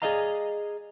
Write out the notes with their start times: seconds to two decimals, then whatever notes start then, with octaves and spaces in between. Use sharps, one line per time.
0.02 G#4 A#4 D5 D#5 F5 A#5